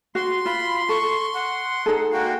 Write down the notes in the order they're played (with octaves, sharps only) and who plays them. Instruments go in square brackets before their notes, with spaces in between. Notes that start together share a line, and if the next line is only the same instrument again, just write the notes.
[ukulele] F#4 [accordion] C6
[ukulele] F4 [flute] B5
[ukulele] A4 [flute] C#6
[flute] F#5
[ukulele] D#4 G#4 A4
[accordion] G#3 A#3 F#4 [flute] G5